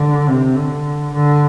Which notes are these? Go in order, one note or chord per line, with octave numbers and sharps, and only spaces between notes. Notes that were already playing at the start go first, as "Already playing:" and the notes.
Already playing: D3
C3
D3
D3